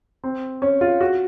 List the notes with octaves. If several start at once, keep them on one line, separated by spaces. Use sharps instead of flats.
C4
C#4
F4
F#4